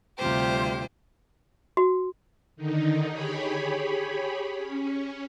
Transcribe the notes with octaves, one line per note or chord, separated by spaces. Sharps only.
D2 C3 G3 F4 G4 C5
F#4
D3 D#3 D#4
G4 G#4 C#5 B5
C#4